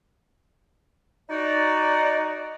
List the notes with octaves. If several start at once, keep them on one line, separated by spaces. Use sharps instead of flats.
D#4 F#4 D5